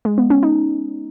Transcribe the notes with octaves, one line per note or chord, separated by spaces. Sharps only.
G#3
B3
C#4
D#4